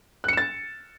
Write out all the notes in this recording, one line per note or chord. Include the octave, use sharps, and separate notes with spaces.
F#6 A6 C#7 E7